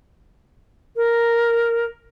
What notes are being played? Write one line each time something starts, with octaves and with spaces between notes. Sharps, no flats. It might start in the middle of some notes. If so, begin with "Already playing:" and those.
A#4